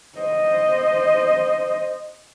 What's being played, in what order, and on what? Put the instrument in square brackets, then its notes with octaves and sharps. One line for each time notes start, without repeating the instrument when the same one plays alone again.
[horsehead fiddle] C5 D#5